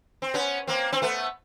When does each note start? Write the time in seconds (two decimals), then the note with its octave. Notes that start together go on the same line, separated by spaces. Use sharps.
0.22 C4
0.34 B3 C#4
0.67 A#3 C4
0.92 C4
1.02 A3 B3